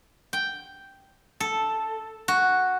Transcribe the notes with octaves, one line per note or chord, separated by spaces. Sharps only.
G5
A4
F#4